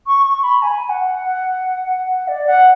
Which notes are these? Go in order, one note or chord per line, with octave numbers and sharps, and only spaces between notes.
C#6
C#6
B5
G#5
F#5
D5
F#5